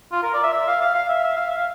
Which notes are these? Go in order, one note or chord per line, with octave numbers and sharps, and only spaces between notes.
F4
A#4
D5
E5
E5
F5
F5
F5
E5
E5
F5
E5
F5